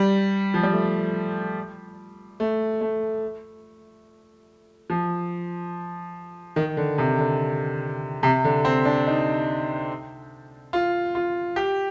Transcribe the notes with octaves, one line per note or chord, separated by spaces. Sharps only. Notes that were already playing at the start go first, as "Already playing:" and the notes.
Already playing: G3
F3
G3
A3
A3
A3
F3
D#3
D3
C3
D3
C3
D3
C4
D4
D#4
F4
F4
G4